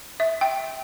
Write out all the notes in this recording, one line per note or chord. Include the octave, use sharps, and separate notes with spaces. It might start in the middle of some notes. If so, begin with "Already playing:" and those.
E5
G5